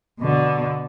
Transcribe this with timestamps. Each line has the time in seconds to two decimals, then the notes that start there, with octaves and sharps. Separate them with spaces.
0.19 B2 D3